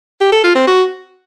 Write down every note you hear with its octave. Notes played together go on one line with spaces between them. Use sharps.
G4
A4
F4
C4
F#4